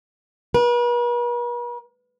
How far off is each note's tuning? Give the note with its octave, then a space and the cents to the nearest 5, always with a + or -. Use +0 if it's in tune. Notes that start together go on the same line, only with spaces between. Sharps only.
B4 -45